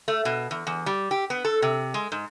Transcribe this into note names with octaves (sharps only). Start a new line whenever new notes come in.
A3
B2
E2
E2
G3
G4
B3
A4
C3
G#3
G#2